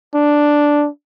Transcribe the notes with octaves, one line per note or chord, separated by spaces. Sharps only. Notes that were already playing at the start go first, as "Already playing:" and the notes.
D4